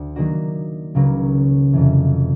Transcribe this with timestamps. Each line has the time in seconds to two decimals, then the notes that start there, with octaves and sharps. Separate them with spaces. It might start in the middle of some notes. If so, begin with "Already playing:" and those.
Already playing: D2 D3
0.16 D#3 F#3 A#3 D4 F#4
0.95 C#2 C#3 F#3 A#3
1.73 F2 C3 E3